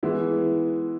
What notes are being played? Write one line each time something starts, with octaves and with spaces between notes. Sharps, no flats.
E3 G#3 B3 E4